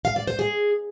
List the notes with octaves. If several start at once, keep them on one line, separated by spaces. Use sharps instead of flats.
F5
D5
C5
G#4